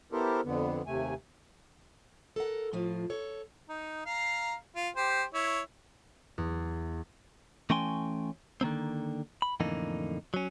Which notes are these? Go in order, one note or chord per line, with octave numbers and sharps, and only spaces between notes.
B3 E4 G4 A4 A#4 C5
F2 D3 B3
D#2 C3 A3 G#5
A4 A#4 F#5
A2 F3 F4
A4 C#5
D#4
F5 A#5
F4
G4 C5
E4 C#5
E2
E3 A3 C#4 G5 G#5 C6
D3 D#3 A#3 C4
B5
F2 A2 D3 E3 A#3 D#4
F#3 C#4